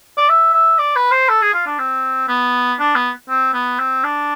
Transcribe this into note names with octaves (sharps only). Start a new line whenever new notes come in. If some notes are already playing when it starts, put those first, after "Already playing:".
D5
E5
E5
D5
B4
C5
A4
G#4
F4
D4
C4
B3
D4
B3
C4
B3
C4
D4